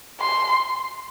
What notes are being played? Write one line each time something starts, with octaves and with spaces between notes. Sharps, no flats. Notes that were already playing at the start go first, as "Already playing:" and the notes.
C6